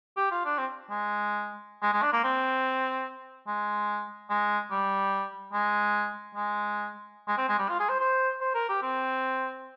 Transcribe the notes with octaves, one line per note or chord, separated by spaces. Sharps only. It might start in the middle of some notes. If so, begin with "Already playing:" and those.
G4
F4
D4
C4
G#3
G#3
G#3
D4
A#3
C4
G#3
G#3
G3
G#3
G#3
G#3
C4
G#3
G3
F4
G#4
C5
C5
C5
A#4
G4
C4